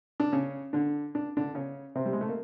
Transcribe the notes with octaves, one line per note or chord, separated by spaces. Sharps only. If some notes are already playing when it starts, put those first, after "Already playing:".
D4
C#3 C#4
D3 D4
D4
D3 D4
C#3 C#4
C3 C4
G3
G#3
A3
A#3